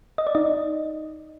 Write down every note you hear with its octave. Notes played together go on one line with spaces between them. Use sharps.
D#5
D5
D#4 D#5